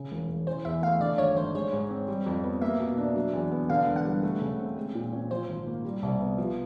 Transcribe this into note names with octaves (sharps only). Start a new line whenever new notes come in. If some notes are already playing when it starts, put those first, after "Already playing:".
Already playing: C#3
E1
E1
E3 C5
E2 E5
A3 F5
D3 D5
G#1 C#5
G#1 C5
G#3 C#5
G#2
C4
G3
F2
B3
A#3 E5
B2
D4
F#3
E2
B3
D3 F5
E1
F#5
G3
A3
C#3
C4
G#3
A#2
C#4
F3 C5
G#1
A#3
G3
C2
B3
F3